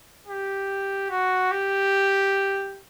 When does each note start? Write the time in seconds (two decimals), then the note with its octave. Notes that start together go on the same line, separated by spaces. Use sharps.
0.28 G4
1.10 F#4
1.51 G4